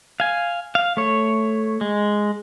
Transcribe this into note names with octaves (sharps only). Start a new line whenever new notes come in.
F5 G#5
F5
A3 C#5
G#3